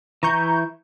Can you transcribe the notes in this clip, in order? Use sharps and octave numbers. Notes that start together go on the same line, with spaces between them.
E3 E4 A#5 C#6 G6